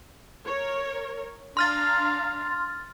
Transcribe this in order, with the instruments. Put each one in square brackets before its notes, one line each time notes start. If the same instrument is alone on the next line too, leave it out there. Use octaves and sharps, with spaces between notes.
[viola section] A#4 C#5
[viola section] D4 F5 A#5 [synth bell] C6 F6 A6